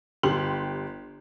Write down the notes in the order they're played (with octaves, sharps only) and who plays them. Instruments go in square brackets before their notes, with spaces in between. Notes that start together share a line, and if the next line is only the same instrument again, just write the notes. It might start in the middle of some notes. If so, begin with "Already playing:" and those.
[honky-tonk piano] G1 G4 C6 F#7